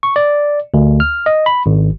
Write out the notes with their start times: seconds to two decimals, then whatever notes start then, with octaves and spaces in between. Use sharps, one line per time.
0.03 C#6
0.16 D5
0.74 D2
1.00 F6
1.26 D#5
1.46 B5
1.66 G#1